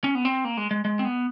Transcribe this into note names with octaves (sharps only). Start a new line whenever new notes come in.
C#4
B3
C4
A#3
G#3
G#3
G#3
C4
B3